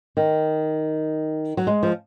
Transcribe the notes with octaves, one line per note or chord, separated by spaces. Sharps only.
D#3
F#3
G#3
F3